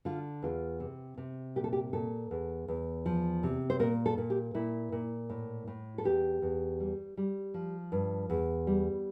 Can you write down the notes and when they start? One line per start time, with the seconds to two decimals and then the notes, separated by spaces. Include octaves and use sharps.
0.05 D3 F4
0.43 E2 F4
0.80 C3
1.18 C3
1.56 A#2 G4
1.64 A4
1.73 G4
1.93 A#2 A4
2.31 E2
2.68 E2
3.06 F3
3.43 C3
3.70 C5
3.79 A#2 A#4
4.06 A4
4.18 A#2
4.30 G4
4.54 A#2 E4
4.92 A#2
5.30 A2
5.68 A2
5.98 A4
6.04 E2 G4
6.42 E2
6.80 G3
7.17 G3
7.54 F3
7.92 G2
8.30 E2
8.67 G3